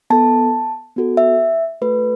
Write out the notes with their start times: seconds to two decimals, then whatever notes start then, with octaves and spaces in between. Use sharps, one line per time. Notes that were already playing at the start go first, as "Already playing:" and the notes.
0.10 B3 A4 A5
0.96 B3 F#4 A4
1.17 E5
1.81 A3 F#4 A4 B4